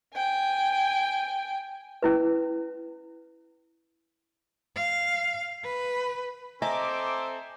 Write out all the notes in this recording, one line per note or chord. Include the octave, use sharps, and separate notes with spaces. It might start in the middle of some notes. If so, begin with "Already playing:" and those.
G5 G#5
C#4 E4 B4
F5
B4
C4 A4 C5 D#5 E5 G#5 A#5 D6